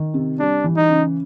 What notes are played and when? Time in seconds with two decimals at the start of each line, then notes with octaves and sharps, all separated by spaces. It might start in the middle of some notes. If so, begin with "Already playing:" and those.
Already playing: D#3
0.14 C3
0.40 G3 D4
0.64 E3
0.77 D#4
0.89 C#3